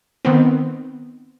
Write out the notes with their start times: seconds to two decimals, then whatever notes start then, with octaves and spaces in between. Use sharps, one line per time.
0.25 D#3 B3 C4